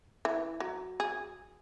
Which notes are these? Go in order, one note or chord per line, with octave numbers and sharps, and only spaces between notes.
E3
F#3
G#4